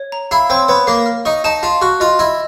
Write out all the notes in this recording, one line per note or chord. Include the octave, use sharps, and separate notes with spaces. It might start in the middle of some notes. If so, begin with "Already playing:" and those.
Already playing: C#5
A#5
E4 F5
C4 C#5
B3 C#5
A#3 F5
F6
D#4 C#6
D#4 A5
F4 F5
F#4 F6
F4 D#5
E4 D#5